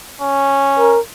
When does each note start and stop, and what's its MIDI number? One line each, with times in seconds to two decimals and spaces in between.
0.21 0.97 61
0.78 1.00 70